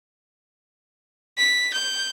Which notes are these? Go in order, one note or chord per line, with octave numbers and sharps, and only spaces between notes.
B6
G6